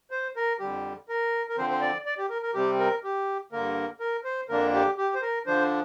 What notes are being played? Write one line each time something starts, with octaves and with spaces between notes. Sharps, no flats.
C5
A#4
F2 D3 G3 G4
A#4
A#4
D3 F3 C4 C5
C5
D5
D5
G4
A#4
A#4
C3 G3 C4 G4
A#4
G4
G2 D3 A#3 A#4
A#4
C5
F2 D3 A#3 D4 A#4
G4
G4
C5
A#4
D3 F3 D4 C5